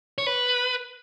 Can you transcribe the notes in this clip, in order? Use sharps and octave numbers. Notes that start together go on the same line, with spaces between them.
C#5
B4